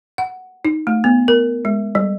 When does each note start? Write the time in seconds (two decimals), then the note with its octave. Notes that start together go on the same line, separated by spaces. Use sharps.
0.18 F#5
0.65 D#4
0.87 A3
1.04 B3
1.28 A#4
1.65 G#3
1.95 G3